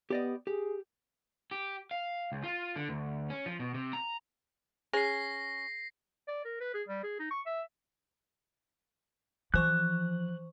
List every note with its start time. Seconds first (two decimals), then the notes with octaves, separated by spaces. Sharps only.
0.10 B3 G4 D5 D#5
0.47 G4 G#4
1.51 G4
1.91 F5
2.32 C#2
2.44 F4
2.76 D3
2.89 D2
3.30 C#4
3.46 F3
3.60 B2
3.74 C3
3.93 A#5
4.93 C#4 G#4 A#6 C7
6.28 D5
6.45 A#4
6.61 B4
6.74 G#4
6.88 G3
7.04 G#4
7.19 D#4
7.31 C#6
7.46 E5
9.54 E3 F3 C5 C#6 F#6